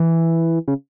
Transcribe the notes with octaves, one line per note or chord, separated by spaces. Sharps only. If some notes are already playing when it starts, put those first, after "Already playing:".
Already playing: E3
C#3